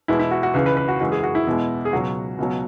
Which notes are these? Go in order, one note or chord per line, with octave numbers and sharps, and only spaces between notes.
E2 B2 G#3 E4
E4
F#4
F#4
C#2 C#3 E3 G#3 B4
B4
B4
F#4
F#2 C#3 E3 G#3 F#4
G#4
F#4
E4
E2 B2 G#3
G#4
C#2 B2 F#3 F#4
C#2 B2 F#3